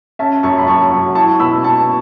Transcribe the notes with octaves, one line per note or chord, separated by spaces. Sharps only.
C#4 E5 A5
F#2 A5 C#6
B5
F#2 A5 C#6
F#3 A5 C#6
E4 A5 C#6
B2 B5 E6
B2 A5 C#6